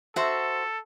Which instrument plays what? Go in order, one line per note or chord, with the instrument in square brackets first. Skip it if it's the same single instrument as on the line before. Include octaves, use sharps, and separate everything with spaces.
[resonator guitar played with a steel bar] F#4 C5 E5 [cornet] A4